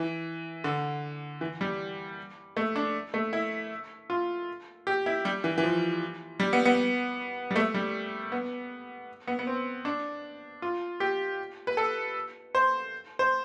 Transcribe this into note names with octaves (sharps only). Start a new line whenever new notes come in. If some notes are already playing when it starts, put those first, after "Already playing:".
Already playing: E3
D3
E3
G3
A3
D4
A3
E4
F4
G4
E4
G3
E3
E3
F3
G3
B3
B3
G3
A3
G3
B3
B3
B3
C4
D4
F4
G4
B4
A4
C5
C5